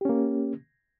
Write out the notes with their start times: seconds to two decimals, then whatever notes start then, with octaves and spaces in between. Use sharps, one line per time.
0.01 G4
0.05 C#4
0.09 A#3